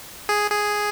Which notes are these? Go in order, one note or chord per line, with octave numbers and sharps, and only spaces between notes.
G#4
G#4